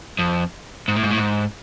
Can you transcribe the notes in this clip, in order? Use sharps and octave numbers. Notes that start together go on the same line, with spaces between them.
F2
G#2
A2
G#2
A2
G#2